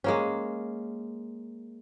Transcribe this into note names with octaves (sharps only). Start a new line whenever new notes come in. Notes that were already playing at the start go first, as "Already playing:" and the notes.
G#3 A#3 C#4